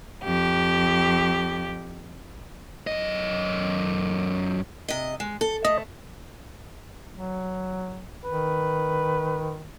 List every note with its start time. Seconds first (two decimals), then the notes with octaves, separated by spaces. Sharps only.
0.23 F2 G4
2.87 F#2 D#5
4.88 C3 D#5
5.20 G#3
5.41 A4
5.65 A3 D#5
7.14 F#3
8.25 D#3 B4